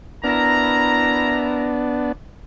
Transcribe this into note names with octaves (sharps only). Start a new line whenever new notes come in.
B3 D4 E4 A#4 A#5